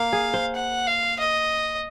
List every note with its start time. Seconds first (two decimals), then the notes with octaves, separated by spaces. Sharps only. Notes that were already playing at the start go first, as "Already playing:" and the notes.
Already playing: A#3 F5
0.13 G#4
0.34 C5
0.55 F#5
0.87 F5
1.19 D#5